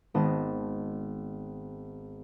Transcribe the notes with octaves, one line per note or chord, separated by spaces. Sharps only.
G#1 B3 D#5 A5